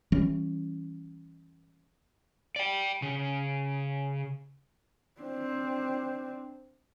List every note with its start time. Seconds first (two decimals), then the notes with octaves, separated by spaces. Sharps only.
0.12 E3 G3 C#4
2.56 D5 G5
3.02 C#3
5.21 C4 D4